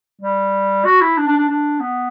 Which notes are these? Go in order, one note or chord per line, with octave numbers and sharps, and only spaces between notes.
G3
F#4
E4
D4
D4
D4
D4
B3